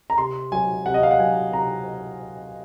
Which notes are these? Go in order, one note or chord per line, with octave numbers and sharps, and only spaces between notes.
A#5
C3 C6
F#3 G#5
C3 F#5
D#5
F5
F#5
F#3 G#5
C3 A#5